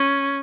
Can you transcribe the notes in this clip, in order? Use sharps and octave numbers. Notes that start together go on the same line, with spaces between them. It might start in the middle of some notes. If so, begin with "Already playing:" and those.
Already playing: C#4